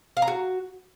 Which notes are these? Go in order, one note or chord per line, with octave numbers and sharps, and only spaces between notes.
F5
A#5
F#4